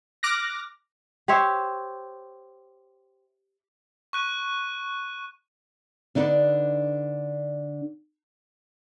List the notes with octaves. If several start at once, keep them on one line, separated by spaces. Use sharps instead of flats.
D6 F6 F#6 A#6
G4 C5 C#5 E5
C#6 F#6 D#7
D3 D4 D#4 A4 B4 D5